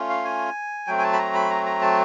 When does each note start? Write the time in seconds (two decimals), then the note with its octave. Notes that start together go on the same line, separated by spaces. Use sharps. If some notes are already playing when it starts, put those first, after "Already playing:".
Already playing: A3 C#4 F4
0.09 F5
0.25 G#5
0.87 F#3 A3 C4 G5
0.99 G#5
1.03 A5
1.13 B5
1.19 A#5
1.34 B5
1.50 A#5
1.66 A#5
1.81 A5